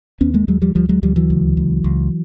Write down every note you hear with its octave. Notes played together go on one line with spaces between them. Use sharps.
D#2 B3 C#4
G#3 A#3
D#2 F#3 G#3
F3 G3
D2 F3 G3
F#3 G#3
D2 F3 G3
E3 F#3
C#2
C#2
C#2